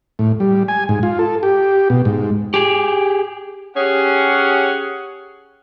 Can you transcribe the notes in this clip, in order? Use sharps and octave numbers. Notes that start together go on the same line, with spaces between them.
A2
G3
G#5
G#2
F4
A4
G4
B2
G#2
G4 G#4
C#4 G4 G#4 C#5 F#5